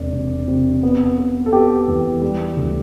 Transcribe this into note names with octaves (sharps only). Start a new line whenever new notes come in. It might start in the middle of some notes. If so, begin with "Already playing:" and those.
Already playing: E1 C3 D5
C3
C3
B3
B3
A4
B3 G4
E2
G3
D2